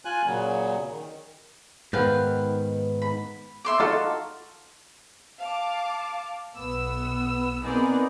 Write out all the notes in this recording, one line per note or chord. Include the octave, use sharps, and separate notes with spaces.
F4 G#5 F#6
A#2 C#3 F#3
D#3
G#2 D#3 B3 B4 F5 G5
B5
E5 C6 D6
D#4 F4 F#4 A4
F5 A5 D6
B1 B3 E6
B3 C4 D#4 G#4 A#4 D5